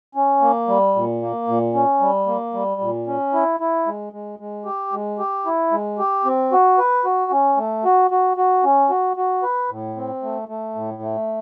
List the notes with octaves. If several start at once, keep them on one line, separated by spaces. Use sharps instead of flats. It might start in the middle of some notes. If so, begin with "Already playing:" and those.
C#4
A#3
G3
A#2
A#3
A#2
C#4
G3
A#3
G3
A#2
C#4
E4
E4
G#3
G#3
G#3
G4
G#3
G4
E4
G#3
G4
C4
F#4
B4
F#4
C#4
A3
F#4
F#4
F#4
C#4
F#4
F#4
B4
A2
C4
A3
A3
A2
A3